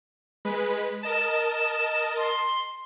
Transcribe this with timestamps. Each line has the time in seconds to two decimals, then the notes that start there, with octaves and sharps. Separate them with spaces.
0.45 G#3 B4 B6
1.03 A#4 D#5 A5 E7
2.17 C6